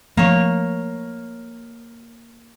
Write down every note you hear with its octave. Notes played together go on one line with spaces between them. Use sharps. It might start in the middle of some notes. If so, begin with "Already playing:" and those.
F3 A3 A#3 C#5